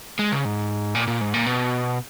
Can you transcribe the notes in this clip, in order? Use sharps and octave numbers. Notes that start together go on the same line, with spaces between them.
G#3
C#3
G#2
A#2
A#2
G#2
A#2
B2